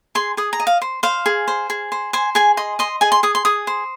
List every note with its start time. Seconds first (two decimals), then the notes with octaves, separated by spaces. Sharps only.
0.15 G#4 C6
0.37 G#4 D#6
0.53 A#5
0.60 D#5
0.67 F5
0.82 C5
1.03 C5 F5
1.26 G#4
1.48 C5
1.70 G#4
1.92 C5
2.13 C5 G#5
2.35 G#4 G#5
2.57 D#5 C6
2.79 D#5 C6
3.01 G#4 G#5
3.12 C6
3.23 G#4 D#6
3.35 C6
3.45 G#4 D#6
3.67 C5